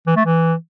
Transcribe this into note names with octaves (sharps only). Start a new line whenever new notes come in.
E3
A3
E3